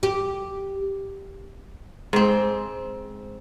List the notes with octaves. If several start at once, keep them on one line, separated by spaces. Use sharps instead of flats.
G4
G#2 C4